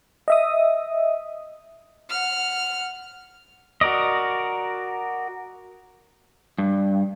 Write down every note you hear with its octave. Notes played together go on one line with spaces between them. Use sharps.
D#5 E5 D#6
F#5 F6
F#4 A#4 D5 D#5
G2